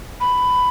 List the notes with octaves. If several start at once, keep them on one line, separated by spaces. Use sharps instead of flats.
B5